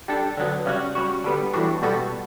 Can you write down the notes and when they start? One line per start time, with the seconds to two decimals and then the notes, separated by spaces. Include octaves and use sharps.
0.08 G3 D4 A4
0.37 D3 F#3 B3
0.66 C#3 G3 C#4 F#4
0.95 G3 C#4 F#4
1.24 D3 G3 B3
1.53 A2 E3 G3 D4 F#4
1.82 B2 G3 B3 F#4 A4